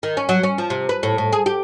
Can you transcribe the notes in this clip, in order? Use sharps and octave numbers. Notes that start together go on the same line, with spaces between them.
D#3
C#4
F#3
C#4
F3
C3
B4
A2
A2
G#4
G4